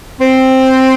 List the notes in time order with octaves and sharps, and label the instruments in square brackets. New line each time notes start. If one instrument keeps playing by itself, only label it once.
[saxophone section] C4